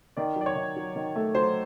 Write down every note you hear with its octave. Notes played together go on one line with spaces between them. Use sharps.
D#3 D5
F#3 D5
C#5
D#3
F#3
D#3
A3
F#3 C5